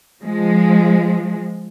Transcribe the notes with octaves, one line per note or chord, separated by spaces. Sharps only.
F3 G#3